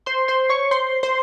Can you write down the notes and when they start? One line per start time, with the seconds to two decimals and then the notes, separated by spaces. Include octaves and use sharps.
0.06 C5 C6
0.28 C5 C6
0.49 C#5 C#6
0.71 C5 C6
1.03 C5 C6